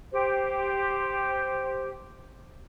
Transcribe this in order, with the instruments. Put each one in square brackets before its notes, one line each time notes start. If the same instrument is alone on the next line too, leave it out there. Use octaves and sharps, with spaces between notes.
[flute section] G4 C5